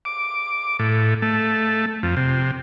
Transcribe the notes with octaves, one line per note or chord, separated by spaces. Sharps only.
D6
A2
A3
F2
C3